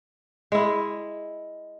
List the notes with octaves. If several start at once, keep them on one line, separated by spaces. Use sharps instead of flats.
G#3 E4